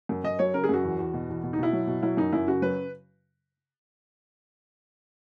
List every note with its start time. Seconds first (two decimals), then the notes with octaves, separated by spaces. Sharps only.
0.09 F#2
0.24 F#2 D#5
0.39 F#3 C#5
0.54 C#3 A#4
0.64 G#4
0.69 F#2 F#4
0.84 E2
0.99 E2
1.14 B2
1.29 E2
1.44 B2
1.53 D#4
1.58 B2 E4
1.73 F#3
1.87 B2
2.03 F#3 E4
2.17 F#2 D#4
2.33 F#2 E4
2.47 C#3 F#4
2.62 F#3 B4